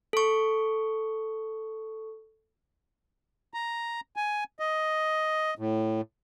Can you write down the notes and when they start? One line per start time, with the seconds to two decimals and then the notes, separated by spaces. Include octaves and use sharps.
0.13 A4 C#6
3.54 A#5
4.16 G#5
4.60 D#5
5.59 A2